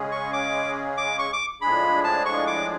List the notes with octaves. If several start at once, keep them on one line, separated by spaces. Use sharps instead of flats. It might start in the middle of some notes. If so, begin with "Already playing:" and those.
Already playing: C#3 G#3 C#4 G#4
C#6
D6
D6
C#6
D6
A2 F3 G#3 D4 G#4 B5
A5
C#6
D6